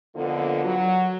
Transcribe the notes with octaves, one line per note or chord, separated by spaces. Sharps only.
F2 D3 A#3 B3 F4
F#3